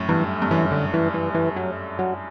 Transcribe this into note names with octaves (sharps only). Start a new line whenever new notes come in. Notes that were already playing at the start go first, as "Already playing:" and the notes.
Already playing: F#2 A2
G2 E3
G2
F#2 E3
D3
E3
E3
E3
F#3
F#3